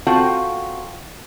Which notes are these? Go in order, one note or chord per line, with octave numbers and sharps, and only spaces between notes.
C4 F4 F#4 A4 G5